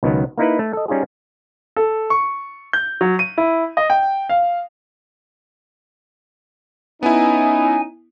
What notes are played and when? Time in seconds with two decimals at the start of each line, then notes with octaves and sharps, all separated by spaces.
0.03 C#2 B2 D#3 F#3 B3
0.37 A#3 D#4 E4 B4
0.59 A3
0.73 A4 D#5
0.88 G3 C#4 D#4 F4 G#4
1.76 A4
2.10 C#6
2.73 G6
3.01 F#3
3.19 D#7
3.38 E4
3.77 D#5
3.90 G5
4.29 F5
7.03 B3 C#4 D#4 E4 G#5